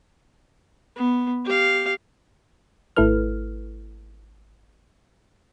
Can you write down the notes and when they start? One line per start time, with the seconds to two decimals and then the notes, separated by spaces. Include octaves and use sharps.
0.96 B3
1.45 G4 F5
2.96 G#1 A3 E4 A4 B4 F6